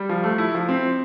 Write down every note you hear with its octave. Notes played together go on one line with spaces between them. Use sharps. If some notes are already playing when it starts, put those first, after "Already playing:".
Already playing: G3
F3
A3
E4
F3
C4